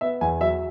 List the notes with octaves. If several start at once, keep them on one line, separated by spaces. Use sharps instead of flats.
B3 E5
E2 G#5
F#3 E5